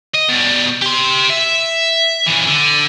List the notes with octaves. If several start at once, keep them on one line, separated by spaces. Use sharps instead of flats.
D#5
B2 G3
G4 C6
E5
A#2 E3
D3